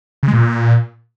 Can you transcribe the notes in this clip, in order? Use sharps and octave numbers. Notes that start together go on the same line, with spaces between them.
C#3
G#3
A#2